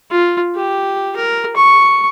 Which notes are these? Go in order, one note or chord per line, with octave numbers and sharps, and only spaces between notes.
F4
G4
A#4
C#6